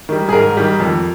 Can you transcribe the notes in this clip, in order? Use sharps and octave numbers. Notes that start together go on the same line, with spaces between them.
D#3 G3
G#4
G#2 A#4
D#3 G3
F2